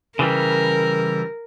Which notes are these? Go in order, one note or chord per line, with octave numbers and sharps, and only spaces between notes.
C#3 E3 G3 A#4